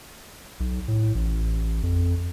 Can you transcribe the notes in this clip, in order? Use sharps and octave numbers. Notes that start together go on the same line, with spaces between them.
B1
A2
A1
F2